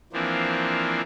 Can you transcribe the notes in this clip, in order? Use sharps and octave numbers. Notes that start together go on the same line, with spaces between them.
E3 F3 A#3 C4 D4